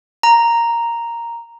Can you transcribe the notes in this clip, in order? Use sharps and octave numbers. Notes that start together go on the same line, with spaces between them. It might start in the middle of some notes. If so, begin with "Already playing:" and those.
A#5